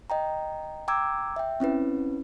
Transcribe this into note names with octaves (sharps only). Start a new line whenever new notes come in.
D#5 G5 A#5
G5 A#5 D6 E6 G#6
E5 G5
C4 C#4 E4 B4